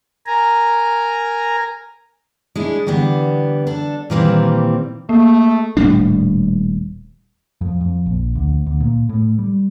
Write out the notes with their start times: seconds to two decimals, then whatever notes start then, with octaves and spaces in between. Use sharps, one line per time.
0.27 A#4 G#5 A#5
2.55 G#3 D4 E4
2.87 D3 E3 G3 B3
3.67 D4 A4
4.10 A#2 D#3 E3 G3 A#3 C4
5.09 A3 A#3
5.77 D#1 A2 G3 D4
7.61 F2
7.81 F2
8.06 A#1
8.35 D2
8.66 D2
8.81 A#2
9.09 A2
9.39 G3